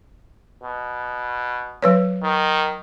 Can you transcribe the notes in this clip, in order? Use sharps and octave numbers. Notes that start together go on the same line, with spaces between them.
B2
F#3 B4 C#5
D#3